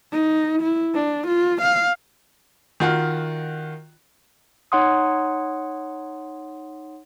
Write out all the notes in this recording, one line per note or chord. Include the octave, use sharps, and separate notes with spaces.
D#4
E4
D4
F4
F5
D#3 F4 F#4
D#4 C#5 F#5 C6 D#6